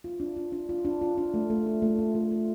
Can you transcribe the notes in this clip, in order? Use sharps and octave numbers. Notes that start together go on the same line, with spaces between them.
F4
D4
F4
D4
F4
D4
F4
D4
A3
A3
F4
A3
F4
A3
F4